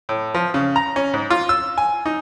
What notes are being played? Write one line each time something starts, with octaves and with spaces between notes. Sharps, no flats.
A2
F3
C#3
A#5
C#4
G#2
F4
E6
G#5
D#4